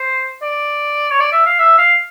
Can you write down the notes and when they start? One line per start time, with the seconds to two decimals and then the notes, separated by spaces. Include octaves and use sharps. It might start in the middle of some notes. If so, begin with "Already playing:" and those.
Already playing: C5
0.42 D5
1.11 C#5
1.20 D5
1.32 E5
1.46 F5
1.59 E5
1.78 F5